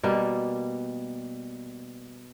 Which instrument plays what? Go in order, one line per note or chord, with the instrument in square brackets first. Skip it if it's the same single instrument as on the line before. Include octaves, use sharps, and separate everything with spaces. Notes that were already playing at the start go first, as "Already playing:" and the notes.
[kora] B2 G3 A#3